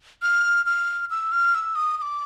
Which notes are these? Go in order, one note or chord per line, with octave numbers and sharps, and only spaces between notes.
F6
F6
E6
F6
E6
D#6
D#6
D6